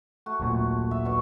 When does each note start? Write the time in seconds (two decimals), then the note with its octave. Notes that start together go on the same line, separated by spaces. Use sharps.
0.26 A3 F#4
0.40 D#1 B1 A#2
0.91 E5
1.05 B2 D4 C#6